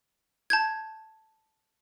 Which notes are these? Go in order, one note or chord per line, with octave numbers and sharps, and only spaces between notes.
A5 G6 G#6